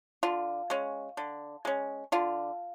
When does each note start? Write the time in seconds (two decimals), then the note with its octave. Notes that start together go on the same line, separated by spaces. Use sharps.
0.23 D3 F4
0.70 G#3 C#4
1.17 D3
1.65 G#3 C#4
2.12 D3 F4